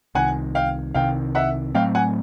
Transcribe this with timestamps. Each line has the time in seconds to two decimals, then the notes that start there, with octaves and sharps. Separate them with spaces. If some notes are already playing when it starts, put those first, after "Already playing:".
0.15 C2 C3 D#3 F#5 G#5
0.55 F5 G5
0.94 C2 C3 D#3 F5 G5
1.35 E5 F#5
1.75 A2 F#3 A3 C4 F5 G5
1.95 F#5 G#5